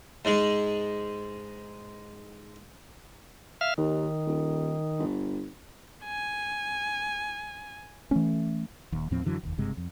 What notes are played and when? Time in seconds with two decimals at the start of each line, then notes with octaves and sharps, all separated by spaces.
0.25 G#2 G#3
3.61 E5 F5 F6
3.78 D#2 D#3
4.26 D#1
4.99 G1
6.05 G#5
8.11 E3 A3 C#4
8.92 D#1 D#2
9.11 D#2 A2 F3 C4
9.25 F#2 D3 E3 F#3
9.43 F1 D#2
9.58 F#1 G2 C3 G#3
9.77 F2